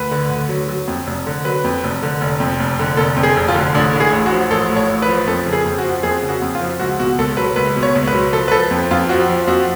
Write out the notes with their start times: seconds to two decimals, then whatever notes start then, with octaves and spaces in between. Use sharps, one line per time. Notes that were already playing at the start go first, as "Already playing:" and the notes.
Already playing: D2 B4
0.11 D3
0.30 D2
0.49 F#3
0.68 F#3
0.88 F2
1.07 F1
1.26 D3
1.45 F#3 B4
1.64 F2
1.84 F1
2.03 D3
2.21 F1
2.40 F2
2.60 F1
2.79 D3
2.97 F1 A4
3.16 F2
3.23 G#4
3.37 F1
3.48 F4
3.55 D3
3.74 A1 D4
3.93 A2
4.00 G#4
4.13 A1
4.26 F#4
4.32 F3
4.51 A1 A4
4.70 A2
4.76 C#5
4.89 A1
5.02 B4
5.08 F3
5.27 F2 A4
5.46 C#3
5.53 G#4
5.65 F2
5.78 F#4
5.84 F3
6.03 F2 G#4
6.23 C#3
6.29 F#4
6.42 F2
6.55 F4
6.62 F3
6.80 C#2 F#4
6.99 B2 F#4
7.18 C#2 A4
7.37 F#3 B4
7.56 C#2 B4
7.76 B2
7.83 C#5
7.95 C#2
8.08 B4
8.14 F#3
8.33 F3 A4
8.48 B4
8.52 F3 A4
8.71 F2
8.91 F2 F4
9.09 F3 F#4
9.29 F3
9.47 F2 F#4